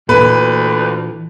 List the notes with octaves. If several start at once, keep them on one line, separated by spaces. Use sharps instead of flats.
D2 A#2 E3 B4